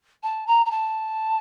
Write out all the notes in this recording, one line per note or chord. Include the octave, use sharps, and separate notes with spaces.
A5
A#5
A#5
A5